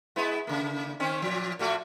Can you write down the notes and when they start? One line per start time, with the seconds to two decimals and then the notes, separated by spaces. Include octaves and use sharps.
0.16 G#3 B3 E4
0.47 C#3 A#3
1.00 D#3 C4 C#4
1.22 A#2 F3
1.59 A#2 A3 F#4